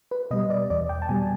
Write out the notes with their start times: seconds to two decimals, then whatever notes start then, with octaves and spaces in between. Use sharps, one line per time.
0.11 B4
0.31 B2 G3 D#5
0.50 D5
0.70 E2 D5
0.89 G5
1.02 A5
1.09 B2 G3 G#5